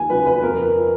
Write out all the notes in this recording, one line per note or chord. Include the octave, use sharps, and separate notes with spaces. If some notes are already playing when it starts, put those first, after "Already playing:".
Already playing: D#2 G#5
C#3 F#3 B4
B4
F2 A#4
F3